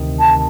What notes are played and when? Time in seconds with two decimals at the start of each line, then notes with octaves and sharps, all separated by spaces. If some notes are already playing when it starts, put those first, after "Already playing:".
Already playing: D2 C3 D#3
0.20 A5